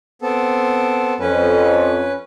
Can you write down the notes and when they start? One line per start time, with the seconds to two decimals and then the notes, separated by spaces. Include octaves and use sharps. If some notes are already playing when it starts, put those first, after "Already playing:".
0.22 B3 C4 A4
1.20 F2 C#4 B4